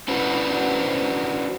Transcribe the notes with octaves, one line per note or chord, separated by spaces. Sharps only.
C#4 D4 E4 F#4 B4 C5